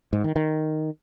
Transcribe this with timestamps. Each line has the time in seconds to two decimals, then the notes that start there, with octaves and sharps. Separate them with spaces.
0.13 G#2
0.24 D#3
0.36 D#3